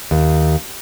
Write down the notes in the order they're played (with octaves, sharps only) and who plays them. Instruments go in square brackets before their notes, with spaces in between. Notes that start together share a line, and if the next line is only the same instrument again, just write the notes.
[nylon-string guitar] D#2